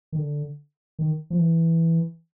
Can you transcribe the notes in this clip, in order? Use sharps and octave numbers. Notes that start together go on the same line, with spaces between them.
D#3
D3
D#3
F3
E3